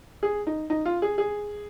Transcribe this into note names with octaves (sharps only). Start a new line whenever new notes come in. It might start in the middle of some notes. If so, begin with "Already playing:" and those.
G#4
D#4
D#4
F4
G#4
G#4